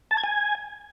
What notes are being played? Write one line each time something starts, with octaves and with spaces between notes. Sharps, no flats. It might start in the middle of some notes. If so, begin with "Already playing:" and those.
A5
G#6
G#5